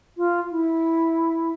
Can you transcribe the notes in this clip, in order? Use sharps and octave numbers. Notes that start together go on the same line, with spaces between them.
F4
E4